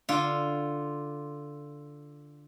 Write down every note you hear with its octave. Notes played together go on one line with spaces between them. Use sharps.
D3 F4